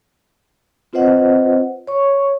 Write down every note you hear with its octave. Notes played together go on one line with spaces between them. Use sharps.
C4 F4 B4 C5 D#5 F#5
C#5 C#6